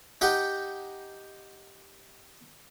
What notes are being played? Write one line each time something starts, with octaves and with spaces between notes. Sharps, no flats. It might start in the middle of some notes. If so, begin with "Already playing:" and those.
D#4 G4 F#5 G5